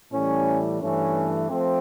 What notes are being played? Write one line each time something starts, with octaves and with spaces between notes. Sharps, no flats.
A2 E3 G3 C#4
G2 E3 A3 C#4
F3 A3 C4